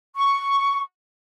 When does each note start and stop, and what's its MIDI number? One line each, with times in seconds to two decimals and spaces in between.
0.15 0.79 85